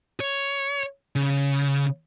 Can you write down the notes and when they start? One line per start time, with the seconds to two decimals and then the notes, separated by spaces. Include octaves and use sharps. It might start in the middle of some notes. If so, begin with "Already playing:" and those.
0.20 C#5
1.16 C#3